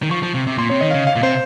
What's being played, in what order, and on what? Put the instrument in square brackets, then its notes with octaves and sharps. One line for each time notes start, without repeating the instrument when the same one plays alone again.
[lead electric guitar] D#3
[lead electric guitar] F3 [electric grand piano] C#6
[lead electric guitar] F3
C3
C3
[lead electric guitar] A#2 [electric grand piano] C6
[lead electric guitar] C3 [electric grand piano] C#5
[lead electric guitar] D#3 [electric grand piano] D#5
[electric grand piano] F5
[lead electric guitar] C#3
[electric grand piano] F5
[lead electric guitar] A#2
[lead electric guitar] C3 [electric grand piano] C5